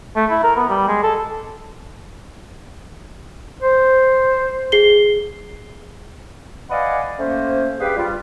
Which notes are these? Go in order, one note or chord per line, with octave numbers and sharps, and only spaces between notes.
A3
E4
A#4
B3
G3
G#3
A4
C5
G#4 C7 G7
B4 D5 D#5 F5 F#5 G#5
A3 A#3 C#4 C5
G2 G4 G#4 B4 F5 G5
G3 F4